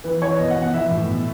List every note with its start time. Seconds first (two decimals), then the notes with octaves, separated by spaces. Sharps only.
0.04 E3 B4
0.22 E3 C#5
0.39 B2 D#5
0.51 F#5
0.56 B2
0.62 F#5
0.74 E3 E5
0.91 A2
1.09 B2